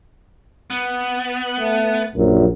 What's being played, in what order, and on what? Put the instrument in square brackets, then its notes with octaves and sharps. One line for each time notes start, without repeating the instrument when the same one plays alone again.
[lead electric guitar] B3
[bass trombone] A3
[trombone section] A#1 [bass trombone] F#2